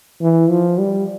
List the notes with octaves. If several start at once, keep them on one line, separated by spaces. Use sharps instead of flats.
E3
F3
G3